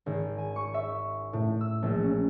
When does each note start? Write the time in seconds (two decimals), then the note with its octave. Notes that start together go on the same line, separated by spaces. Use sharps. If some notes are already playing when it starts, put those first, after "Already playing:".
0.06 G#1
0.38 G#5
0.56 C#6
0.74 E5
1.33 A2
1.61 E6
1.83 A#1
2.03 C#4